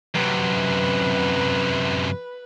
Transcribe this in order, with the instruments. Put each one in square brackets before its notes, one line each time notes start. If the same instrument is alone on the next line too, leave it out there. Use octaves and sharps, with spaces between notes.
[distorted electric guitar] F#2 C3 [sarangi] B4